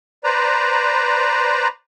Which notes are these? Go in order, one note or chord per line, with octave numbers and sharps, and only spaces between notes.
B4 C5 D5 A#5